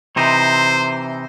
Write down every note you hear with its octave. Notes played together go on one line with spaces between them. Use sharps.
C3 E3 D#4 C5